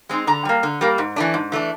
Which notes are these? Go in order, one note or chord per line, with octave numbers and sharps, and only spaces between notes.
G#3 C4 D#4
D3 A#5
G3 A#3
D3
G3 A#3
G#2
E3 A3 D4
G#2
E3 A3 D4